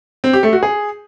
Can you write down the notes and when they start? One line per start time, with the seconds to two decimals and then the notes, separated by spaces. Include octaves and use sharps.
0.24 C4
0.33 G4
0.43 A3
0.53 F#4
0.63 G#4